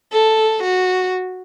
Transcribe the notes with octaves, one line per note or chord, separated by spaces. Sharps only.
A4
F#4